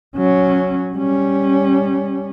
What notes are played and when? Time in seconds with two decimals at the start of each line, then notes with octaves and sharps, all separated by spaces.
0.17 F#3 C#4
0.94 G3 C#4